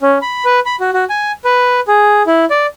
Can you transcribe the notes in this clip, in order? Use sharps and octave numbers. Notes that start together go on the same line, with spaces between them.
C#4
B5
B4
B5
F#4
F#4
G#5
B4
G#4
E4
D5